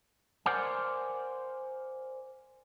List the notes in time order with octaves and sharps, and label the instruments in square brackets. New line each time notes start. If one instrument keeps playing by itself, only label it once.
[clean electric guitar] A#4 C5 D5 F#5 G#5